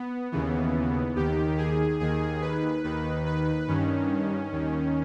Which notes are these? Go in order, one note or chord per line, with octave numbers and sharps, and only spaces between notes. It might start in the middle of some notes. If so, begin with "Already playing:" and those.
Already playing: B3
D#2 C#3 E3 B3
D#2 D#3 G4
G#4
D#2 D#3 G#4
B4
D#2 D#3 B4
B4
G2 D#3 C#4
D#2 D#3